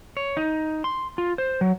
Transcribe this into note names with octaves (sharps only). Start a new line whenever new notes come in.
C#5
D#4
C6
F4
C5
F#3